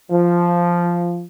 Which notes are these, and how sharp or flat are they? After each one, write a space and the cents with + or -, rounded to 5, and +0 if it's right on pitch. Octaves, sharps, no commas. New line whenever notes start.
F3 -5